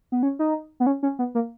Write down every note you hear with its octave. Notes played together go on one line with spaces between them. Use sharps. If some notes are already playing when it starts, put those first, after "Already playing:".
B3
C#4
D#4
B3
C#4
C#4
B3
A#3